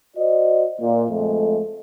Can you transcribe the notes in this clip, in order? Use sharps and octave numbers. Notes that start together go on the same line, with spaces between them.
F#4 C5 D5 D#5
A#2
F2 G#3 A3